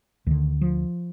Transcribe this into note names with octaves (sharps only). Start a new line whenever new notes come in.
D2 D3 D#3
F3